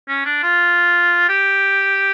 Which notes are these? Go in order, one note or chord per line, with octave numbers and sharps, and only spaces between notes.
C#4
D4
F4
G4